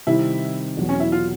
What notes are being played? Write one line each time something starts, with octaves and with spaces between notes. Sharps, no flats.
C3 D#3 G3 C4 E4
E2 B2 F#3
C#4
E4
F4